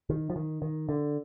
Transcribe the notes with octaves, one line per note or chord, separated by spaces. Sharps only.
D#3
F3
D#3
D#3
D3